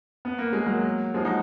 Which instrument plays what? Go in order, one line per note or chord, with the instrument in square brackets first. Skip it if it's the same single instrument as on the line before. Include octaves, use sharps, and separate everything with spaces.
[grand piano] B3
A#3
G#3
F#3 A#3
F3 G#3
D#4 F#4